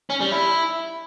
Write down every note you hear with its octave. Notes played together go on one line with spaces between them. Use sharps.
C#4
G3
E4